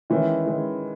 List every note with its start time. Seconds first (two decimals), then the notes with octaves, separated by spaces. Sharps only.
0.10 D#3 E3 G#3 C#4 E4
0.44 D#3 G#3 C#4 E4